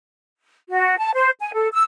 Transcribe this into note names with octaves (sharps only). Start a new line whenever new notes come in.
F#4
A5
C5
G#5
A4
E6